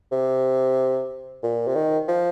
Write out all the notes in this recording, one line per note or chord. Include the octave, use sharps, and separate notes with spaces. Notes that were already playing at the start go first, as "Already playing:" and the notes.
C3
A#2
C3
D#3
F3